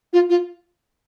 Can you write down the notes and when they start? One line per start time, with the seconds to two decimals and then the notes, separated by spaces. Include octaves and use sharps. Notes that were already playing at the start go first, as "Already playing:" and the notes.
0.13 F4
0.29 F4